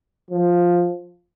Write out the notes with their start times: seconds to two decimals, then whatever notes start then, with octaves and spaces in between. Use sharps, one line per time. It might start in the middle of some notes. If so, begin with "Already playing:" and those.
0.31 F3